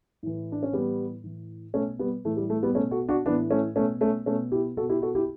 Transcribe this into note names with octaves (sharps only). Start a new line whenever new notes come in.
A2 E3
D4
C#4
A2 E3 G3 B3
A2 E3
B2 A3 C#4
G3 B3
A2 E3 A3
G3
A3
G3 B3
B2 A3 C#4
F#4 A4
D4 F#4
A2 E3 B3 D4
A3 C#4
B2 A3 C#4
A3 C#4
B2 A3 C#4
E4 G4
B2 F#4 A4
E4 G4
F#4 A4
E4 G4